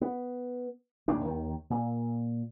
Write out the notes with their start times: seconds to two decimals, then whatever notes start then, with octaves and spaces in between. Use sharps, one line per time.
0.01 B3
1.08 A#1 D#2 A2 D4
1.25 D#2 D#3
1.70 A#2